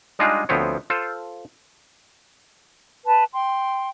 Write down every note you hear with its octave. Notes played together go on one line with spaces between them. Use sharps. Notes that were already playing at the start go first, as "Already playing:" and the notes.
G3 G#3 D4 D#4 F4 G#4
D2 F3 B3 C4 C#5
F4 A4 C5
B4 A5
G5 C6